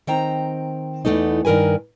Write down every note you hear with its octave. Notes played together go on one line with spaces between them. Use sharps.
D#3 C4 G5 A#5
E2 C3 E3 A3 B3 D#4
G2 D#3 A#4 B4 G#5